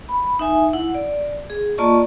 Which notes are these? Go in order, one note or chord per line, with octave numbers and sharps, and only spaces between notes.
B5
D#4 E5 G#5
E4 F#5
D5
G#4
A#3 F4 D5 D#5 A5 C#6